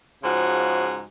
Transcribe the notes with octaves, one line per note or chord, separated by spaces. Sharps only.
G#2 C#3 F3 F#4